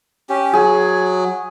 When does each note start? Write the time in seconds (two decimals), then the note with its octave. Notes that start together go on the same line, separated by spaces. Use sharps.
0.29 C#4 G4
0.53 F#3 G#4